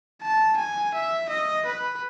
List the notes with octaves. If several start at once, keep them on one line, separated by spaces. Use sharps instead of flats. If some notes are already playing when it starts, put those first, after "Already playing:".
A5
G#5
E5
D#5
B4